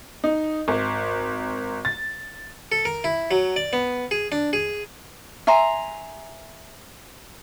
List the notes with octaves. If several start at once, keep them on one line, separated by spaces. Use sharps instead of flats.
D#4
G#1
A6
A4
A#4
E4
F#3
D5
B3
G#4
D4
G#4
E5 G#5 A#5 C6